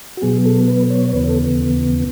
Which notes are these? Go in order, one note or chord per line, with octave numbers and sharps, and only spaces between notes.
F#4
B2 F#3 B3 G#4
A4
B4
C#5
C#5
D#2 C#3 E3 B3 B4
A4